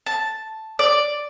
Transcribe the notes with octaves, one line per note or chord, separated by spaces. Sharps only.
A5
D5